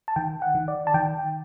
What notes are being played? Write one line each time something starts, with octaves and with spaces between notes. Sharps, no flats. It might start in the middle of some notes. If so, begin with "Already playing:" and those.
A5
D#3 G5
F#5
D#3
D5
A5
D#3 G5